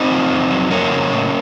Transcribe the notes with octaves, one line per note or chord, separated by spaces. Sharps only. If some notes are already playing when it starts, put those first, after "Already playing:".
Already playing: C4 D#4
F3
F2
F#3
F2 A#3 C#4
C#3
A2